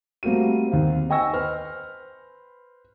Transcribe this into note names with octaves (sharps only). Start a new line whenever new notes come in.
G3 A3 A#3 C4 F#4 D#7
D#2 C4 F5
D#5 G5 G#5 C#6 E6 A#6
B4 C5 F6